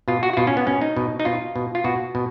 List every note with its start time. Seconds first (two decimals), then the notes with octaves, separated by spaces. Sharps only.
0.08 B2 F4
0.23 F#4
0.33 F#4
0.37 B2 F4
0.47 C#4
0.57 B3
0.67 B2 C#4
0.82 D#4
0.96 B2
1.20 D#4
1.25 B2 F4
1.56 B2
1.75 F4
1.84 B2 F#4
2.15 B2